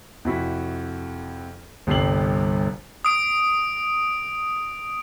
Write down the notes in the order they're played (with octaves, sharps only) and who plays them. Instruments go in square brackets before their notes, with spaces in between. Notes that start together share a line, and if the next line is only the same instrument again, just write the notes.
[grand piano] F2 C3 E4 F#4 B6
G1 C2 G4 C7 F#7
[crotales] D#6 D7